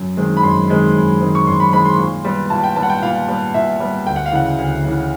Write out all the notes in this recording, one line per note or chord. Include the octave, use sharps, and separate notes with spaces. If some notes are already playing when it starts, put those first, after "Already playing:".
Already playing: F#2
D#3 G#3 C4
B5
F#2 C6
D#3 G#3 C4
F#2
D#3 G#3 C4
C#6
F#2 C6
B5
D#3 G#3 C4 B5
C6
A#2
G3 B3
A#2 A5
G5
G3 B3 A5
F#5
G5
A#2 F5
G3 B3
A#2 E5
G3 B3
D2 G5
F#5
F5
C#3 E3 F#5
D2
C#3 E3